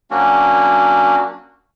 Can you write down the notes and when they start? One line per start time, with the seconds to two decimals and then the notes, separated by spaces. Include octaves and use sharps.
0.11 F#3 A#3 C#4 D4 F#4